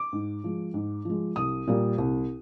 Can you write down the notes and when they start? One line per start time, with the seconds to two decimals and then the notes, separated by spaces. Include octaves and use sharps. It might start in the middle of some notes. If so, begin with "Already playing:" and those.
Already playing: D6
0.13 G#2
0.44 F3 G#3
0.74 G#2
1.05 F3 G#3
1.36 C2 D#6
1.67 A#2 G3 A#3
1.98 C2